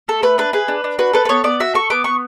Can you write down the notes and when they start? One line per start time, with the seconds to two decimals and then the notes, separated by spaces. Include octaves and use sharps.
0.08 A3 A4
0.22 A3 B4
0.38 D4 B4
0.53 G#4 B4
0.68 D4
0.84 D4
0.99 F#4 B4
1.13 A4 B4
1.25 B4
1.29 B3 C#5
1.44 B3 D5
1.60 F#4 E5
1.74 A4 C#6
1.90 B3 D6
2.04 B3 C#6